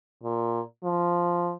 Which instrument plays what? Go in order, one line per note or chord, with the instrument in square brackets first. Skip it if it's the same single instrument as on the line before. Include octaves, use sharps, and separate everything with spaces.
[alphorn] A#2
F3